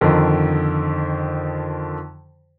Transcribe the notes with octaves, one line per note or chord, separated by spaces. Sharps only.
F2 D3 D#3 F3